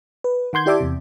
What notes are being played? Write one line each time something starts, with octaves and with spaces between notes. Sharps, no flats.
B4
D#3 F#5 C6 G6 G#6
E4 G4 D5 E5 A5 D6
E2 C3